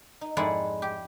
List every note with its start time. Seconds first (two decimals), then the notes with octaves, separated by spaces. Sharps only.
0.21 D#4
0.37 F2 G#2 G#3 E4 D5 F#5
0.82 G4